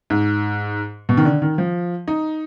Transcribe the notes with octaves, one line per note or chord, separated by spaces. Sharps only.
G#2
B2
D#3
D3
D#3
F3
D#4